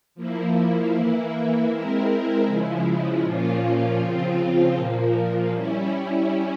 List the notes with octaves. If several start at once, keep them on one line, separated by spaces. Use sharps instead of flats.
F3 A#3 E4
E3 A#3 E4
G#3 C4 E4 A#4
C#3 F3 G#3 E4
A#2 F3 A#3 C#4 F4
C#3 F3 C4 F4
A#2 F3 A#3
G3 C#4 E4